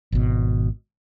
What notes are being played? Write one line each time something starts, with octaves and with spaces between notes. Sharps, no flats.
G#1 B2